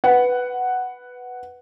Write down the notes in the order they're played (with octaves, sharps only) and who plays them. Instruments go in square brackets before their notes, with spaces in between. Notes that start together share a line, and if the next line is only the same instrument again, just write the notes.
[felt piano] B4 F#5